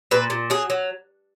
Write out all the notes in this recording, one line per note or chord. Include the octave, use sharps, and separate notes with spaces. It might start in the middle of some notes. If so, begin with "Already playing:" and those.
A#2 B4
A#2
F#3 G#4
F#3